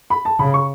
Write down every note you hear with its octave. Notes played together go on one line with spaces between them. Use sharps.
B5
A5
C#3 B5
C#6